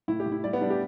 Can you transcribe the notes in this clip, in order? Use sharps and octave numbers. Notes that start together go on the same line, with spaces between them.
A2 E4
G4
A2
E4
G3 D5
B3
G3 D4
G4